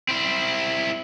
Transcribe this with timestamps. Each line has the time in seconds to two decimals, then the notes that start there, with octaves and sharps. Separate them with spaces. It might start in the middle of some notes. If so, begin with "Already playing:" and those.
0.09 C4 E4